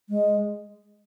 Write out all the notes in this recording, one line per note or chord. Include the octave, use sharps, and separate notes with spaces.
G#3